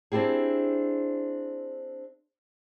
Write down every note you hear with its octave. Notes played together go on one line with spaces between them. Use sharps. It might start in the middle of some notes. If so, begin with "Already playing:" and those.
C4 D4 E4 G4 G#4